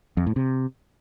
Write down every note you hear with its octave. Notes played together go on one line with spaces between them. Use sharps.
F2
A2
C3